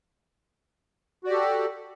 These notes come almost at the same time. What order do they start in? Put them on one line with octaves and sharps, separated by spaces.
F#4 D5 G4 A4